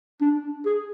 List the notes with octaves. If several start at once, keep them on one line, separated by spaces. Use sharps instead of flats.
D4
G#4